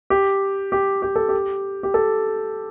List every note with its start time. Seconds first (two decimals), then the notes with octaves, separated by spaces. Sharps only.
0.10 G4
0.72 G4
1.02 G4
1.16 A4
1.29 G4
1.83 G4
1.94 A4